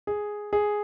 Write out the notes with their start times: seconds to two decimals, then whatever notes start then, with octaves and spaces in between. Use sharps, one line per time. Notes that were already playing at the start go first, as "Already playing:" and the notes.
0.07 G#4
0.53 G#4